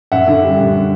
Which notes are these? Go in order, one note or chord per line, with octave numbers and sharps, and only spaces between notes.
F#2 E5 F#5
D3
G3
F#2